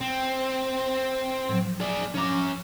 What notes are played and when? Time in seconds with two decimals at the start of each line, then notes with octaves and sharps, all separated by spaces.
0.01 C4
1.49 A2 F3 F#3
1.80 G#4 D5
2.14 F3 C#4 A#5 D6